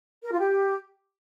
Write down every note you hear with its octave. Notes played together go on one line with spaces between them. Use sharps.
A#4
F4
G4